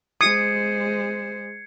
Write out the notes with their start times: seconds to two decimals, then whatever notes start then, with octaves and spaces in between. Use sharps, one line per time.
0.21 G#3 C5 D#6 G#6 C7 C#7